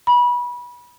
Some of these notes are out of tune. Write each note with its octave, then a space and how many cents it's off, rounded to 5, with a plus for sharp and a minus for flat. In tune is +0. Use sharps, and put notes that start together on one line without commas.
B5 -25